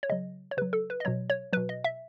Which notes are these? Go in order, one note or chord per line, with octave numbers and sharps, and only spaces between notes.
C#5
C#3 F#3 D#5
C#5
C#3 F#3 B4
A4
B4
D#5
B2 F#3 C#5
C#5
B2 F#3 B4
D#5
E5